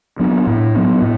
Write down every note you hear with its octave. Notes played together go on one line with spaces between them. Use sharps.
F#3 B3 D4
A2
F#3 B3 D4
A2